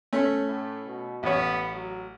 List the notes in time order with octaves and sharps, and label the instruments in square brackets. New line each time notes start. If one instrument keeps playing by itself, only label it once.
[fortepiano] A3 C#4
[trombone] A2
B2
[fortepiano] A1 C#5 [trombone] B3
[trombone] F#3